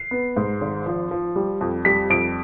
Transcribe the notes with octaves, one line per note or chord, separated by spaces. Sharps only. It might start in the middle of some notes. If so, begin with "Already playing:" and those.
Already playing: C7
B3
G#2
G#1
F3
F3
G3
F2
G3 B6
F2 D7